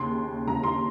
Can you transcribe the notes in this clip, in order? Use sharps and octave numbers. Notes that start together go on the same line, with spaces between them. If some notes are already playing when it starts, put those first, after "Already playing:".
Already playing: D#2 C#3 C6
D#2 C#3 A#5
C6